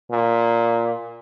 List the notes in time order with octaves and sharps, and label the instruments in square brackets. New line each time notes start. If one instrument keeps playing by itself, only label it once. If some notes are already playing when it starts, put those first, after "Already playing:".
[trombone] A#2